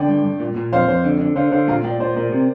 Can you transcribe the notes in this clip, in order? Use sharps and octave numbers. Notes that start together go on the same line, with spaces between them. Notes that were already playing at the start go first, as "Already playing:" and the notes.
Already playing: D3 D5 G5
G2
G2
A#2
A#2
F2 C5 F5
F2 C5
D3
D3
D3 C5 F5
D3 C5 F5
A#2 F5 A#5
A#2 D5 G5
A#2 C5
A#2 A#4 D5
C3